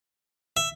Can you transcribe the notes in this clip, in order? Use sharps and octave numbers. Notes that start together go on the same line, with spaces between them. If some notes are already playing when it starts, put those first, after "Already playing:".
E5